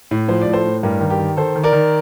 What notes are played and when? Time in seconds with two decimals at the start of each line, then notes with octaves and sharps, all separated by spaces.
0.11 A2
0.28 F3 C5
0.41 A2 D5
0.53 A4 C5
0.64 A2
0.83 G2 G4 A#4
1.01 D#3
1.10 G4 A#4
1.19 D#3
1.37 D#3 A4 C5
1.55 D#3
1.64 A#4 D5
1.73 D#3